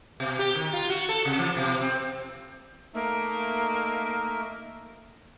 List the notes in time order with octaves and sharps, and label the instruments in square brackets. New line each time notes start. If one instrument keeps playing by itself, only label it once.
[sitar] B2
G4
D#3
F4
F#4
A4
C3
E3
B2
C4
[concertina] A3 D#4 E5 [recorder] A#3